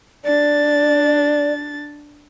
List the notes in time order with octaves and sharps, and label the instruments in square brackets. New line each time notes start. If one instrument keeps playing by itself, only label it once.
[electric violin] D4 A6 [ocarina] D5